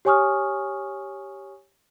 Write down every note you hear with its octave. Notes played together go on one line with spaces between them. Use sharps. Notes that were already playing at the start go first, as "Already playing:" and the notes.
G4 C#5 G#5 C#6 D#6 F6